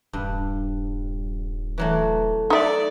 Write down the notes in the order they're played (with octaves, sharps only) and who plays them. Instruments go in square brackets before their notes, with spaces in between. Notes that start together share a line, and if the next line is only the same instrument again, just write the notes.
[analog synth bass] D#1 [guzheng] G2
[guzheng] E3 F#3 A3
[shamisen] D#4 E5 [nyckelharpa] A4 D5